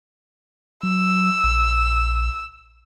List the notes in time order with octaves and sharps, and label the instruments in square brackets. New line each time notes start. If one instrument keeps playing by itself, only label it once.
[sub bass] F#3 [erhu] E6
[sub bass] A#1